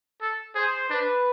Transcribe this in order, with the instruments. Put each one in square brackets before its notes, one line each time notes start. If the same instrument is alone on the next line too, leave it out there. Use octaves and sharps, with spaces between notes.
[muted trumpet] A4
[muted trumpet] G#4 [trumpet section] C5
[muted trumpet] D4 [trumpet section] B4